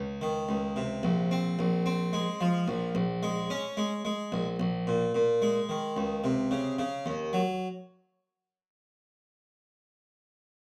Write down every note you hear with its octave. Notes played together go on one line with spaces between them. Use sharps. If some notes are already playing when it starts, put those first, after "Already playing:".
Already playing: C#2
D#3
C#2
C3
A#1
C4
A#1
C4
G#3
F3
A#1
A#1
G#3
C#4
G#3
G#3
A#1
A#1
A#2
A#2
G#3
D#3
C#2
C3
C#3
C#3
D#2
F#3